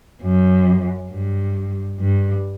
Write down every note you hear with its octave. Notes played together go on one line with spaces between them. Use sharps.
F#2
G2
G2